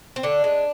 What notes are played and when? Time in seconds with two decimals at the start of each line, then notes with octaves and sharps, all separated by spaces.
0.16 C4
0.23 D3 D4
0.44 G#3